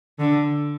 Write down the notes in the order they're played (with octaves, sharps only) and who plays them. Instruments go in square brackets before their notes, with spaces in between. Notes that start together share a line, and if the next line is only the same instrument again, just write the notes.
[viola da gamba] D3